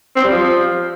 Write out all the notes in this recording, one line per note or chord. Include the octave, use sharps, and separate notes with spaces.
C4
G3
F3